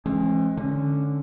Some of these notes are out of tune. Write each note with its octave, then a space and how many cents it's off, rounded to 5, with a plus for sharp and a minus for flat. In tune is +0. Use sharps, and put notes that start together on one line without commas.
E3 +35 G#3 +20 C#4 -45
D3 +0 C#4 +0